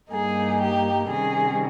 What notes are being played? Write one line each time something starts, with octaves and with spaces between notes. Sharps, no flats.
G2 G3 A#3 D#4 G#4
G4
C3 D#3 G3 C#4 G#4